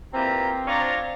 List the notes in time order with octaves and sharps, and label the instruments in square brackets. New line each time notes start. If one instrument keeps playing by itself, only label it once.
[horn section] A#2 E3 F4 [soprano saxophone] C4 [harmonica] G4 A#5
[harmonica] D4 F4 [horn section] C5 C#5 A#5